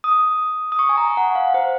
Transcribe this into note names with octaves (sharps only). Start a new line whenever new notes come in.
D#6
D#6
C#6
G#5
A#5
F#5
F5
C5